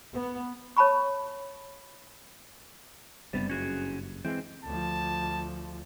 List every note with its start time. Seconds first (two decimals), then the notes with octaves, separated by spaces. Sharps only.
0.13 B3
0.77 C#5 A5 B5 C#6
3.33 F#1 G2 C3 G3 B3
3.50 C#4 F#4 G#4
4.25 E3 G#3 C4
4.65 D2 F3 A5